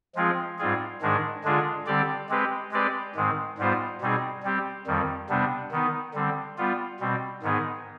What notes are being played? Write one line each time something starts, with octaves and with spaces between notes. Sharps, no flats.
F3 G#3 C4 F4 G#4
G#2 G3 C4 F4 G#4
G#2 D#3 G#3 D4 G#4
D3 G#3 D4 F4 G#4
D3 G3 C4 G4 D5
G#3 C4 G4 B4
G#3 C4 G4 B4 D5
G#2 D#3 G#3 C4
G#2 G3 B3 F4 C5
B2 G3 C4 D#4 G#4
G3 C4 G4
F2 D#3 G3
C3 G3 B3 D4
D#3 B3 D#4
D3 G3 C4
G3 B3 F4
B2 G3 C4
G#2 D#3 B3 D#4 G#4